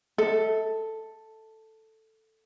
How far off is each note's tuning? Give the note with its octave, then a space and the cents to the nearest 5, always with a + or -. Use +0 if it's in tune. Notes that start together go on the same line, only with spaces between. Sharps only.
A4 +5 E5 -35